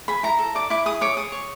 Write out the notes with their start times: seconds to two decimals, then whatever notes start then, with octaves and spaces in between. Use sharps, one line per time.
0.08 G#4 B5
0.23 E4 A#5
0.39 A4
0.55 D5 D6
0.70 E4 D6
0.86 G#4 D#6
1.01 C#5 D6
1.17 G#4 D#6
1.32 C#5